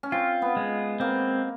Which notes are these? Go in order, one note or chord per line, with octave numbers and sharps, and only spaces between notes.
C#4
C4 F4
B3
G#3
A#3 C4